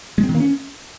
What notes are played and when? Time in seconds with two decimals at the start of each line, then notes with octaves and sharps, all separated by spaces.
0.18 G#3
0.24 C4
0.29 D#3
0.35 A#3
0.40 C#4